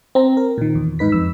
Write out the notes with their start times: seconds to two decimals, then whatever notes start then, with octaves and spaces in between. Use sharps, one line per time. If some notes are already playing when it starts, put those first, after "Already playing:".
0.15 C4 A#5
0.37 A#4
0.58 A#2 D#3
0.75 E2
0.99 G#2 D#4 B4 B6
1.12 F2 E6